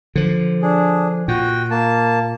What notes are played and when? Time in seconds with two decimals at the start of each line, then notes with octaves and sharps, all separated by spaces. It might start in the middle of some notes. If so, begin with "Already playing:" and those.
0.16 D3 F3
0.62 D4 G#4
1.28 A#2 F#4 G5
1.71 A#3 A5